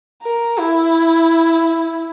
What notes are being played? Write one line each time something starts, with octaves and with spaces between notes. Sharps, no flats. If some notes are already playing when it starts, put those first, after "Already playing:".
A#4
E4